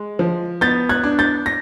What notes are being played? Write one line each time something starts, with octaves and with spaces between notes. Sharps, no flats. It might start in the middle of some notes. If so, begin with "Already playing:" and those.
Already playing: G#3
F3
B3 G6 A6
F#6 G#6
D4
G6 A6
A#6